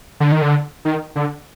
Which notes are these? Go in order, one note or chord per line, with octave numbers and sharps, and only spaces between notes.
D3
D#3
D3
D#3
D3